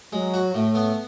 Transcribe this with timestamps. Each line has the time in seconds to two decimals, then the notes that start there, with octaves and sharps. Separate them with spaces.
0.13 F#3 G#3
0.34 F#4
0.55 A2 A3
0.75 B3